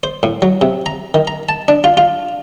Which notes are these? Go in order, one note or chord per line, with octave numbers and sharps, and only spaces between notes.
C5
A2
F#3
C3
A#5
D#3
A#5
A5
D4
F4
F4